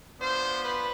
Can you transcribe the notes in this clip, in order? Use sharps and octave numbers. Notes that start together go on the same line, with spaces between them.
B3 D4 F4 C5
B4